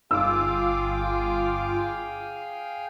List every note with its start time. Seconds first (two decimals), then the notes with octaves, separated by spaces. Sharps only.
0.11 G1 F4 G#4 F5 G5 D6 E6